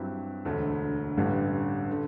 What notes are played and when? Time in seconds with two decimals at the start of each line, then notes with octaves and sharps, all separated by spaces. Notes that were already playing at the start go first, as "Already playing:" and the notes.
Already playing: G2 F#3 C4 E4 G4
0.45 E1 D2 D3 A3
1.17 A1 G2 D3 G3
1.91 D3